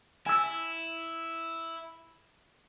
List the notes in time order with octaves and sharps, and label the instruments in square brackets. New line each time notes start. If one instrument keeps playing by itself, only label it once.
[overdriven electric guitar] E4 [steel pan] G#5 E6